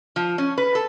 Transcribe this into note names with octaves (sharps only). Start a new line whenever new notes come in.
F3
C#4
B4
A4